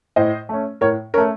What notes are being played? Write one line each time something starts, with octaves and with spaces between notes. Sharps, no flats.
A2 C5 D#5
A3 C#4
A2 A#4 C#5
A3 C#4 A#4 C#5